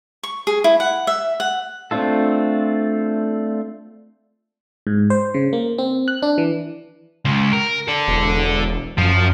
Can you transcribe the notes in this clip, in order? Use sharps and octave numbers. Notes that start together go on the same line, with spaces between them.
C#6
G#4
E4
F#5
E5
F#5
A3 C4 D4 F4 A4
G#2
C5
C#3
A#3
C4
F#6
D4
E3
C#2
A#4
A4 D5
E1
F#2 F3